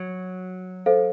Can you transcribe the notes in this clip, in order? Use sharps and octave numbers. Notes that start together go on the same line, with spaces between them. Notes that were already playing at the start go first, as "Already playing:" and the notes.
Already playing: F#3
A4 C5 F5